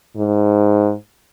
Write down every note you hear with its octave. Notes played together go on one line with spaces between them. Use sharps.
G#2